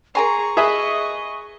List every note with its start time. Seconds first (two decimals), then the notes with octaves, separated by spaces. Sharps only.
0.15 G#4 A#4 G#5 A#5 C6 C#6
0.57 G#4 B4 D#5 E5